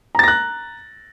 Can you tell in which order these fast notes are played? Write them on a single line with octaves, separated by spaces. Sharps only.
A#5 A6 A#6 F#6